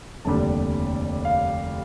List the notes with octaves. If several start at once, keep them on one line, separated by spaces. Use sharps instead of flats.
F1 D#2 D3 G3 A5
F5